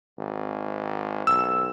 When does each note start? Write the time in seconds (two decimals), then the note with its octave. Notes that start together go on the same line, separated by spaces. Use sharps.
0.19 G#1
1.27 B1 E6